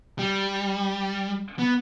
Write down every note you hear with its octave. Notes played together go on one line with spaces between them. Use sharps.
G3
B3